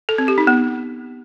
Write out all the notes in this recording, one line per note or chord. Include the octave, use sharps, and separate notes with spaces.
A4
C4
G4
D#4
B3